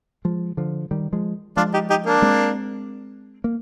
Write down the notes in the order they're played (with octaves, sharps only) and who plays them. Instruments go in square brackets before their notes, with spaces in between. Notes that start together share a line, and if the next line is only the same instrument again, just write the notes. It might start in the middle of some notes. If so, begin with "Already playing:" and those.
[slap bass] F3 G#3
D3 F3
D#3 G3
F3 G#3
[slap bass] F3 G#3 [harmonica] D4 F4
[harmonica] D#4 G4
D#4 G4
A#3 D4
[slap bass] G#3 C4
A#3